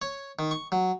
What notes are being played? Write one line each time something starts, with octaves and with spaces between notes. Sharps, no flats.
C#5
D#3
C#6
F#3